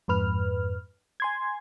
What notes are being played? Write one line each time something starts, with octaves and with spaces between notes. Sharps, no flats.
F2 G#2 B4 F6
G#5 C6 G#6